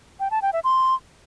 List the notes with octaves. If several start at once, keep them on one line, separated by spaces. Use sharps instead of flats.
G5
A5
G5
E5
C6